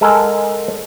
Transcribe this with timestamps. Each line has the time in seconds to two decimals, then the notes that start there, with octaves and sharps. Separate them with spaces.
0.01 G#3 A4 A#4 F#5 G#5